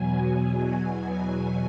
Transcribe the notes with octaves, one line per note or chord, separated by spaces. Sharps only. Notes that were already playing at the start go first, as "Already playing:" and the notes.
Already playing: E2 B2 F#3 G#5
G#5
G#5